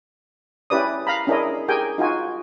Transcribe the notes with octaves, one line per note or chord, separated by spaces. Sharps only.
C#4 E4 G4 B4 D5 D#6
F5 A#5 B5
C#4 D4 E4 G#4 A#4 D#5
G4 G#4 A#4 G5 G#5
D#4 F4 F#4 G#5